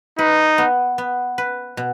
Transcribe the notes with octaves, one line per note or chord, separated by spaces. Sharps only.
D#4 B4
B3
B3
B4
B2